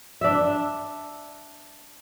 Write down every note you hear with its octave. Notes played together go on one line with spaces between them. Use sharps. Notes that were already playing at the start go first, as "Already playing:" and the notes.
D4 E5